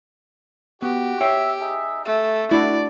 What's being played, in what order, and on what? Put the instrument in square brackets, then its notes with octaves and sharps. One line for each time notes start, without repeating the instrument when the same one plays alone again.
[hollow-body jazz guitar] B3 [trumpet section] F#4 [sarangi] G4
[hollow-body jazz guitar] C#5 G5 [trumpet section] E5
[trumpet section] D#4 G#4 E5
[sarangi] A3 [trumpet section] E5
[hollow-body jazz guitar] A3 D4 F#4 [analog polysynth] E4 [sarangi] D5